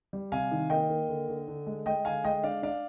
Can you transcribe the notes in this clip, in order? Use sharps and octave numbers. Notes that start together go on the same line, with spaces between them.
G3
C3 F5 G#5
D#3
A#3 D#5 G5
A#3
D3
D3
D3
G#3
G#3 D#5 G5
D3 F5 G#5
G#3 D#5 G5
D4 D5 F5
D4 D5 F5